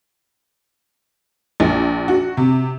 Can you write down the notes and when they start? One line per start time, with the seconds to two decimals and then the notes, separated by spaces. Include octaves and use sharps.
1.60 A#1
2.08 F#4
2.37 C3